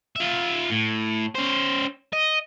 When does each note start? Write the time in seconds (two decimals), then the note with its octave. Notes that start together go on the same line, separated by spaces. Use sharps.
0.16 F4 E5
0.70 A2
1.35 C#4 C5
2.13 D#5